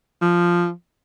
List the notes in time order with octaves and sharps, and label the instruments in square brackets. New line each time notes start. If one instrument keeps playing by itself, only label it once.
[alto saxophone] F3